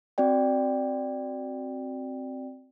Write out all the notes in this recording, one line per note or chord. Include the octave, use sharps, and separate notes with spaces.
C4 F#4 D5 G5